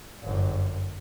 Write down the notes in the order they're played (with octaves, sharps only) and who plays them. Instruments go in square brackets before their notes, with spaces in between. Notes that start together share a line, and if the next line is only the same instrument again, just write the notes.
[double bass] G1 F#2